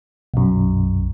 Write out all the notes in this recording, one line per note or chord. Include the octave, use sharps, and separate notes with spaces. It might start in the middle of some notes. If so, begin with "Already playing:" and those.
B1 F#2